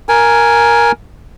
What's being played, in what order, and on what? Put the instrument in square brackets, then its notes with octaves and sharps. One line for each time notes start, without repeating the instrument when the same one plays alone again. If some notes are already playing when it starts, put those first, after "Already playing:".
[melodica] A#4 G#5